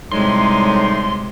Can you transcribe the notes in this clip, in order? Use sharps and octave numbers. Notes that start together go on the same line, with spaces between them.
A2 C3 G3 G#3 D#4 C6